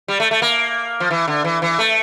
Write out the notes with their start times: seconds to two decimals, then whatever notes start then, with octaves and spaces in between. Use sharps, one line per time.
0.08 G3
0.20 A3
0.31 A3
0.42 A#3
1.00 F3
1.11 E3
1.28 D3
1.44 E3
1.62 E3
1.79 A3